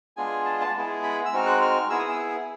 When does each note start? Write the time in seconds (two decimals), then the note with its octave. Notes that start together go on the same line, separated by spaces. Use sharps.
0.17 G#3 B3 D4 F4 G#4 G#5
0.45 A5
0.61 A5
0.75 G#3 B3 E4 G#4
1.04 B5
1.26 E6
1.32 G#3 C4 D#4 F#4 F6
1.46 F#6
1.62 F6
1.90 B3 E4 G#4 E6
1.99 D#6
2.09 E6